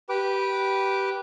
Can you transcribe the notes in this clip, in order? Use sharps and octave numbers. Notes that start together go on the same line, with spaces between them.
G4 B4 D6